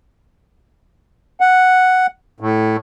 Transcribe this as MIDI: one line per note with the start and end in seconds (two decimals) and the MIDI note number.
1.40 2.07 78
2.40 2.76 45